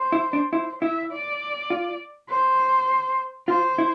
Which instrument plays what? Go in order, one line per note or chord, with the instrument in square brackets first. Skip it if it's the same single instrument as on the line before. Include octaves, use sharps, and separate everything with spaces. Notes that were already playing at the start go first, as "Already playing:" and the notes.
Already playing: [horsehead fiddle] C5
[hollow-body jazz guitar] E4
D4
[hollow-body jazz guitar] E4 [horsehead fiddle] C5
[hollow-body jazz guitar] E4 [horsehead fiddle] E5
[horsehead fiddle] D5
[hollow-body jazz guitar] F4
[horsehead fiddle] C5
[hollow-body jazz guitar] F4 [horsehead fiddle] C5
[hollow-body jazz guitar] E4